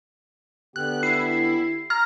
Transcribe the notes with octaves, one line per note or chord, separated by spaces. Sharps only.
D3 B3 G4 F#6
E4 C7
A#5 F6